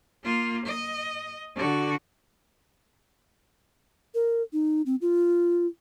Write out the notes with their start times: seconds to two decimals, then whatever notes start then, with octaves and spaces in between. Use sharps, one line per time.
0.23 A#3 F4
0.66 D#5
1.56 D3 F#4
4.15 A#4
4.53 D#4
4.86 C4
5.01 F4